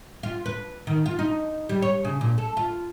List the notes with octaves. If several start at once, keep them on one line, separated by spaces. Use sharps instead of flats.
F4
B4
D#3
F4
D#4
G3
C#5
C#3
A#2
A4
F4